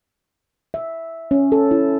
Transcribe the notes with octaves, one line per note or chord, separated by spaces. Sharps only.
E5
C#4
A4
E4